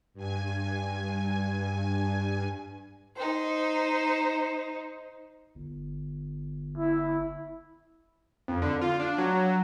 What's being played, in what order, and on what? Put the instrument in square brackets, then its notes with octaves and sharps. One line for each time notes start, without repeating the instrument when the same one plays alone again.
[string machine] G2 G#5
[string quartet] D#4 C5
[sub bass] G1
[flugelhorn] E4
[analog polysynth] F2
D3
F4
D4
F#3